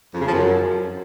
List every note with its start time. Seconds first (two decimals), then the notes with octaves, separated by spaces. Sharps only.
0.14 F2
0.21 C#3
0.27 F3
0.33 F#2